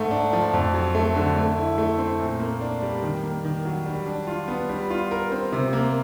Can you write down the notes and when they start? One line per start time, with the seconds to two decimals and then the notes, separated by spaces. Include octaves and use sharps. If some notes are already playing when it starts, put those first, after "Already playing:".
Already playing: G#2 A3
0.11 D4
0.33 F3
0.53 F2
0.74 F#3
0.95 A3
1.16 D3
1.36 A3
1.58 E4
1.78 A3
1.98 C4
2.20 A#2
2.40 A#3
2.61 D4
2.82 G3
3.03 D#3
3.23 A#3
3.44 D#3
3.65 F#3
3.86 G3
4.07 D4
4.27 F4
4.48 B3
4.69 G3
4.90 F4
5.11 A#4
5.32 C4
5.53 C3
5.73 A#3